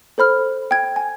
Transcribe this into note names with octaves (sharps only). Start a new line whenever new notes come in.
A4 C5 B5 F6
G5 G#6
G#5